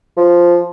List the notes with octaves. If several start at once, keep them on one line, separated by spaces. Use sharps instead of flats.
F3